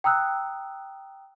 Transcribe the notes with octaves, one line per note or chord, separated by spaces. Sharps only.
G5 A#5 D#6 E6 F#6